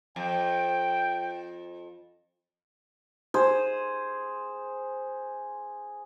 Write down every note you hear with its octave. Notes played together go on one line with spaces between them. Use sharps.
F2 G5
G#4 C5